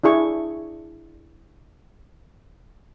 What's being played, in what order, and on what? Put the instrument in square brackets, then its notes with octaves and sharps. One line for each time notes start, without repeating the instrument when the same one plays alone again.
[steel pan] D4 E4 G#4 C#6